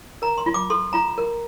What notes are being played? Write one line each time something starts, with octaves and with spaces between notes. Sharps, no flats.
A#4 A#5
C6
F4
D6
A4 C6
F4 A#5
A#4